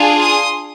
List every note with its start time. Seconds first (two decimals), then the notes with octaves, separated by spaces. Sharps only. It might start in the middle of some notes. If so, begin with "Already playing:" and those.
Already playing: D4 F4 G#4
0.20 C6 D#6